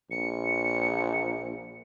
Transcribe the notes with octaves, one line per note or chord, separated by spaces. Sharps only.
A#1 C#7